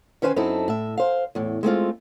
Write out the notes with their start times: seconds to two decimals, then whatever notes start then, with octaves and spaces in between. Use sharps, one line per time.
0.22 D#3 C#4 B4 C5 F#5 G#5
0.36 F#2 C4 D#4 E4 A4
0.68 A2 E5
0.98 C5 F5
1.35 E2 A2
1.63 G#3 A3 C4 F4